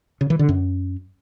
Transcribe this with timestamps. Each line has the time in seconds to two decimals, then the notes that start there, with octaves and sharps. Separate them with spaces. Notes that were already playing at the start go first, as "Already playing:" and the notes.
0.21 C#3
0.30 E3
0.39 D3
0.49 F#2